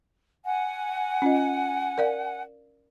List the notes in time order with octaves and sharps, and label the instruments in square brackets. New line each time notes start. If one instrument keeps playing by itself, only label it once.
[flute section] F#5 G#5
[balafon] C#4 F4 D#5
A#4 D5 F5